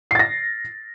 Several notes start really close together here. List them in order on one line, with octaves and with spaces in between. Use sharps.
C7 A6 A#6